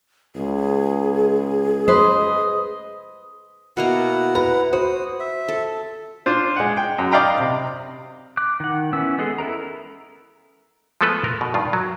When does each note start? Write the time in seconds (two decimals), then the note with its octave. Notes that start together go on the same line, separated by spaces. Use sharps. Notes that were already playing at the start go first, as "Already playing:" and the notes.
0.36 C#2 G#4
1.88 B4 C5 D#5
3.77 B2 A#3 E4 F#5 A#5
4.35 B4 A#5
4.73 F#4 C5 D#6
5.20 E5
5.48 A4
6.26 D4 F4 C5
6.56 G#3 F#5
6.77 G5
6.98 F#2
7.11 D5 D#5 F5 G5 A#5 B5
7.40 C3
8.37 D6 F#6
8.60 D#3 F#5
8.93 E3 B3 C#4 E6
9.18 G#3 B3 G#4 A4
9.38 E4 A4 A#4 A#5
11.01 F3 G#3 A3 B3 A4 B4
11.24 A#4
11.41 B2
11.54 G2 D#3 F4
11.73 F#3